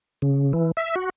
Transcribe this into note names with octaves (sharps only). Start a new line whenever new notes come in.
C#3
E3
E5
F#4